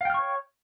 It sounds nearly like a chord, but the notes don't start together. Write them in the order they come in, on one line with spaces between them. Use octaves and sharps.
F5 G5 F6 C#6 C#5